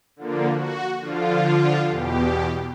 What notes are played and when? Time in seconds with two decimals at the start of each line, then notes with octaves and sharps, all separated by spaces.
0.16 D3 F3 A#3
0.53 F#4
1.00 D3 F3 F4
1.86 E2 B2 G4